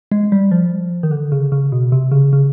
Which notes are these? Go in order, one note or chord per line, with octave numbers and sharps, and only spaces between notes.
G#3
G3
F3
D#3
D3
C#3
C#3
B2
C3
C#3
C#3